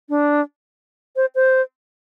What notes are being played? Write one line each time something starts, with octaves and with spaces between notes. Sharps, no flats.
D4
C5
C5